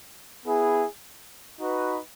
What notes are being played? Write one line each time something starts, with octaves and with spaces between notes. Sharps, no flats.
B3 E4 G#4
D#4 F#4 B4